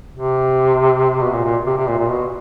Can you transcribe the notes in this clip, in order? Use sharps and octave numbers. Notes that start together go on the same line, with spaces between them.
C3
B2
A#2
A#2
C3
C3
A#2
A#2
B2